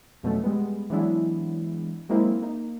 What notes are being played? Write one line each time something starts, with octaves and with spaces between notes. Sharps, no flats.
F2 B2 F#3 A3 C#4
G3 G#3 B3
E3 F#3 G#3 B3 D4 E4
F#3 G#3 A#3 C4 E4
A#3 D#4